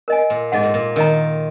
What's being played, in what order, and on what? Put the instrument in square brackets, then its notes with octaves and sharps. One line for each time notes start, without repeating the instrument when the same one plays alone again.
[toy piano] A#4 D#5 G#5
[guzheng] A#2
[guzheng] G#2 [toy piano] G#4 D#5 F#5
[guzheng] A#2
A#2
[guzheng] D#3 [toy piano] A#4 D#5 A#5